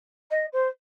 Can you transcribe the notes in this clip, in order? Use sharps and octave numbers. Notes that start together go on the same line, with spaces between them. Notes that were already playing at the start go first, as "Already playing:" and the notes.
D#5
C5